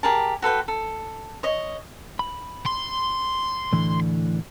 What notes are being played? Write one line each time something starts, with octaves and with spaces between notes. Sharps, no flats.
G4 G#4 A#4 A5
F#4 A4 B4 G5
A4
C#5 D#5
B5
C6
A2 D3 E3